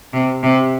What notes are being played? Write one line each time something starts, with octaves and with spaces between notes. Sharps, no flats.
C3
C3